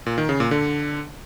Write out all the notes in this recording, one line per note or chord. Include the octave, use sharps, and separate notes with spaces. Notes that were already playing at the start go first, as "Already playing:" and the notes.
A#2
D#3
C#3
A#2
D3